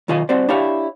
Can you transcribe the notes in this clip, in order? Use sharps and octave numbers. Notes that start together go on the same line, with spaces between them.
B1 D#3 F4 D#5 G#5
G3 C4 F#4 C5 D5
D4 E4 G4 C#5 F5